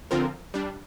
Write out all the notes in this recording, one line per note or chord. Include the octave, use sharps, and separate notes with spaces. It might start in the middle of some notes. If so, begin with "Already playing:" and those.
D3 F3 C4 F4 A#4
G3 D4